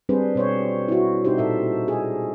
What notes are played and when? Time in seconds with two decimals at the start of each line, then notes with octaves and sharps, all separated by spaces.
0.09 G3 C4 D4 G#4 B4 C5
0.35 B2 C5 C#5
0.88 E4 F#4
1.24 B2 D4 D#4 G4 C5
1.38 A#2 A4 E5
1.88 G#4 D#5